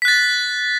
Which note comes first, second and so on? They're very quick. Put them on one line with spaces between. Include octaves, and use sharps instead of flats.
B6 F#6 A6